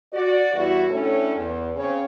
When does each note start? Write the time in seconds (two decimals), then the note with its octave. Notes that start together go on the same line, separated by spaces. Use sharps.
0.13 F#4 D5
0.54 E2 E3 G3 E4 F#4
0.90 A2 A3 C#4 D4 A4 C#5
1.35 E2
1.76 C#3 C4 C#5